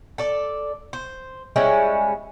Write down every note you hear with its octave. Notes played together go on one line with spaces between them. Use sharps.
A4 D5
C5
G3 G#3 C#4 E4